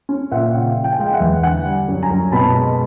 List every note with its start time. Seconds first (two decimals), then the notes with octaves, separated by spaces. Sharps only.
0.09 C#4
0.31 A#2 E5 F#5
0.54 C#3 F5 G5
0.76 F3
0.84 G5
0.92 G#5
0.99 G#3 F5 G5
1.14 E5 F#5
1.20 E2
1.43 D3 F#5 G#5
1.65 G3
1.88 F#2
2.03 G#5 A#5
2.10 F#2
2.32 B2 A5 B5
2.54 G#3